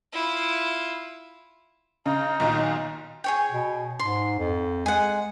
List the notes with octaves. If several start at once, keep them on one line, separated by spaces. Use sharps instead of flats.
E4 F4
C#3 D#4
B1 A#2 D#3
G#4 C#5 G5
B2
G#2 C6
F2
G#3 G#4 F#5